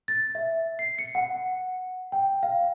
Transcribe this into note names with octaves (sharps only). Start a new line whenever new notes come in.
A6
E5
C7
C#7
F#5
G5
F5